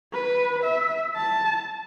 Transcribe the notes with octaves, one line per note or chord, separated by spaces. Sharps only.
B4
E5
A5